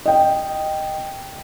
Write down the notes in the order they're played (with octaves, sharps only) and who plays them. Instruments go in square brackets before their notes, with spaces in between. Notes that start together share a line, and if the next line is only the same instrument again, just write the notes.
[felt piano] D#5 G5